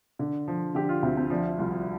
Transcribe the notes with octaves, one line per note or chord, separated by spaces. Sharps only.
D3
F3
D3 G4
F4
D2 C4
C4
F3 D4
C2 F4